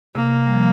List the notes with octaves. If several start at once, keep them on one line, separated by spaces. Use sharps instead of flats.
C3 A#3
G3
F3